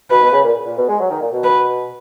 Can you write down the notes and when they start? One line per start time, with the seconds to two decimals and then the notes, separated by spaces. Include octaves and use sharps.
0.11 B2 B4
0.22 B2
0.32 C#3
0.44 A#2
0.66 A#2
0.78 B2
0.89 G#3
1.00 F#3
1.10 D#3
1.21 A#2
1.32 B2
1.44 B4